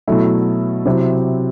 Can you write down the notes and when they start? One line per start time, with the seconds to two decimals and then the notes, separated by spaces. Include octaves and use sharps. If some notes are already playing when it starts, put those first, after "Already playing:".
0.08 B2 F#3 A3 E4
0.85 C3 F#3 C4 E4